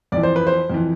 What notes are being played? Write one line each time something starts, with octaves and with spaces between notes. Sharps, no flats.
F2 E3 D5
C5
B4
C5
F2 E3